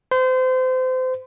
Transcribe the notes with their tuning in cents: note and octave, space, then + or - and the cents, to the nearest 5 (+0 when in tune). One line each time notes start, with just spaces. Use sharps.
C5 -30